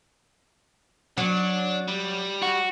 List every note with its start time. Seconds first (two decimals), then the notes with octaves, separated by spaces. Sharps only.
1.18 F#3 D4
1.88 G3
2.42 F#4